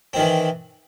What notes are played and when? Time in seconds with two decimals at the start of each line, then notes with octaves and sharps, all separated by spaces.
0.13 C4
0.16 D#3
0.19 E3